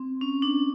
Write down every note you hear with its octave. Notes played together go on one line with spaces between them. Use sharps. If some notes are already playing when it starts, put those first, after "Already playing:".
Already playing: C4
C#4
D4